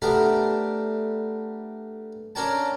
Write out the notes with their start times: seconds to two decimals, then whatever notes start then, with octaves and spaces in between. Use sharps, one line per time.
0.02 A3 B3 D4 G4 A#4
2.35 C#4 D4 A#4 C#5 G5 A5